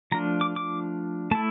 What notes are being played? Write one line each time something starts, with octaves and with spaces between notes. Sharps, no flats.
F3 A3 D4 F4 A#5
D6
D6
A3 E4 A5